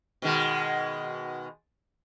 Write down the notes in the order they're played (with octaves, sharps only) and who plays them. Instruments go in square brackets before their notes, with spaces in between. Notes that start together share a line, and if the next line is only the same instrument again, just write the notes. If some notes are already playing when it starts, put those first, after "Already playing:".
[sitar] B2 D#3 G#3